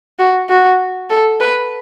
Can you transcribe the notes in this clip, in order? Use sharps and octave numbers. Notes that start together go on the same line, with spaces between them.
F#4
F#4
A4
B4